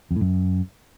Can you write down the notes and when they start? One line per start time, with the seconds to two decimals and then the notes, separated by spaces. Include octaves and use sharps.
0.11 F2
0.16 A2
0.21 F#2